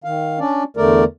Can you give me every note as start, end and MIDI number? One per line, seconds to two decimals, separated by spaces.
0.04 0.39 51
0.04 0.39 77
0.40 0.63 61
0.40 0.63 62
0.40 0.63 74
0.77 1.04 40
0.77 1.04 50
0.77 1.04 57
0.77 1.04 70
0.77 1.04 74